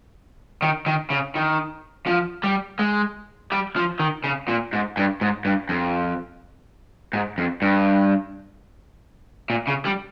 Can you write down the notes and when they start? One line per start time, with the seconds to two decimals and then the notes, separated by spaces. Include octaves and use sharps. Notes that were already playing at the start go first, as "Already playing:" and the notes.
0.62 D#3
0.86 D#3
1.10 C#3
1.35 D#3
2.07 F3
2.44 G3
2.79 G#3
3.52 G3
3.76 F3
4.00 D#3
4.24 C#3
4.48 A#2
4.73 G#2
4.97 G2
5.21 G#2
5.45 G2
5.69 F2
7.13 G#2
7.38 F2
7.62 G2
9.50 A#2
9.67 C#3
9.85 G3